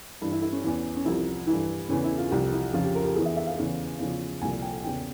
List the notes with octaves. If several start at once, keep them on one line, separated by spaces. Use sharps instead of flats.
G2 E3 E4
E4
E4
C#4
E2 E3
C#4
C2 C3 F3 E4
G2 E3 E4
E2 C#3 E3 C#4
E4
F4
C2 C3 F3 G4
E4
F2 C#3 F3 F4
G4
A#4
G4
E2 E3 G#4
E5
E5
F5
E2 C#3 E3
E2 C#3 F3
C2 A#2 F3 G#5
G5
E2 C#3 E3 G5